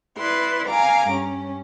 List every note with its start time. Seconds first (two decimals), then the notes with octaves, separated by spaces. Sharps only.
0.18 E4 B4 D5 C6
0.67 F5 G#5 A#5 D6
1.07 G2 C#4